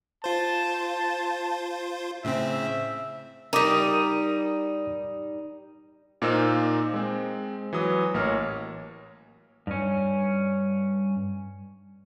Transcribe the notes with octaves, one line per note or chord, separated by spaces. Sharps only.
F4 C5 A5
A2 C#3 C4 E5
G3 D#4 A#4 D6 D#6
A#2 A#3 D#4 A#4 C5 E6
G#3 C4
E3 F#3 D#6
A1 A#3 C#5 F6
G2 C#4